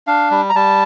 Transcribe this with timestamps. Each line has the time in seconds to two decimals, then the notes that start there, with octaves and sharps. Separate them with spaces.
0.07 D4 F5
0.31 G3
0.50 A#5
0.55 G3 A5